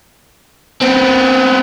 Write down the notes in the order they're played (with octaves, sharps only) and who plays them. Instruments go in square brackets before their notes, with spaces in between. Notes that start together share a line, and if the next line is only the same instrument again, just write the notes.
[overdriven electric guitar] B3 C4